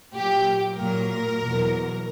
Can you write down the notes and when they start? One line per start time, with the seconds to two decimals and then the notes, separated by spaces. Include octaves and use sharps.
0.14 A#2 F#3 G4
0.77 A#2 F#3 A#4
1.40 E2 B2 F#3